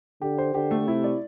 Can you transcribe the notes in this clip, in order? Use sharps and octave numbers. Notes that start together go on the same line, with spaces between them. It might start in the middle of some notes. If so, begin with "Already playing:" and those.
D3 G4
C5
D3 G4
A3
C3 E4
D5